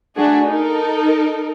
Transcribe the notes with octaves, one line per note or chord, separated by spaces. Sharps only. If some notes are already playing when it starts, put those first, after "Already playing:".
A3 D4 F#4 G#4
D#4 A4 A#4